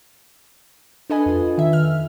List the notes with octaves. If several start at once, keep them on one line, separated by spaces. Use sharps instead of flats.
D4 A4 B4 D#5 G#5
F2 F4
D#3 E5
F6